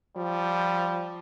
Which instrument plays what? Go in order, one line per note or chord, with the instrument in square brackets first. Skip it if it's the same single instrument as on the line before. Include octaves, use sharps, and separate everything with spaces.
[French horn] F3 [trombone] G3